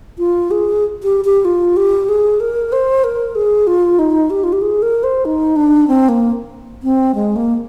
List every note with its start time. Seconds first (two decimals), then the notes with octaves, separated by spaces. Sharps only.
0.18 F4
0.51 G#4
1.03 G4
1.25 G4
1.45 F4
1.76 G4
2.09 G#4
2.40 A#4
2.72 C5
3.04 A#4
3.35 G#4
3.67 F4
3.99 D#4
4.30 G4
4.44 F4
4.53 G4
4.62 G#4
4.82 A#4
5.04 C5
5.25 D#4
5.56 D4
5.88 C4
6.09 A#3
6.83 C4
7.15 G#3
7.36 A#3